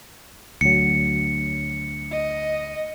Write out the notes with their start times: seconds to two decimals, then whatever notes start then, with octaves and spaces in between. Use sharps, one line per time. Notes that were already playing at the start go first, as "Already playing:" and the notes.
0.61 D2 F#3 C#7
2.11 D#5